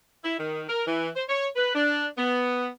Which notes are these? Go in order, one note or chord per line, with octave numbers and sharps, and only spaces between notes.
E4
D#3
A#4
E3
C5
C#5
B4
D4
B3